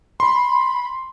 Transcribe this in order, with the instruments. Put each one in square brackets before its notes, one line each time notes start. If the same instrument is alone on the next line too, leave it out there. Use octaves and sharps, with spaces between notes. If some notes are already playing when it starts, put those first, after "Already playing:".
[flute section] B5 [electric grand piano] C6